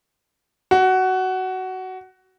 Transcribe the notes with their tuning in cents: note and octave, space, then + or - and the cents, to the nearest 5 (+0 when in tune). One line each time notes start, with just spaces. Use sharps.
F#4 +15